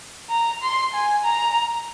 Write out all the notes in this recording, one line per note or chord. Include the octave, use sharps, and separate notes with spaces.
A#5
C6
G#5
A#5